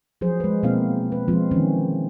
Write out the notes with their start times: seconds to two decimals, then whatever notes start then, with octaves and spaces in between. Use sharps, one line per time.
0.21 F3 F#3 G#4 C5
0.40 G#3 B4
0.63 B2 A#3 C4 E4 F5
1.12 B4
1.28 F3 G#3 C4 F4
1.51 D#3 E3 C4 C#4